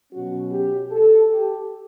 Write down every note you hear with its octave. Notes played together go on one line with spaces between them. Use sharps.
B2 F#3 C#4 F#4
G4
A4
G4